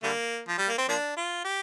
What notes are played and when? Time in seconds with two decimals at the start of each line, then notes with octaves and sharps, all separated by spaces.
0.03 D3 G3 A#3
0.48 F3
0.58 G3
0.68 A#3
0.78 C4
0.88 F3 A#3 D4
1.17 F4
1.45 G4